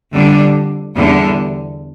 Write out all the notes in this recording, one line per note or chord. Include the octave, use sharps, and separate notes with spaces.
F2 D3 G3 D4
E2 D3 G3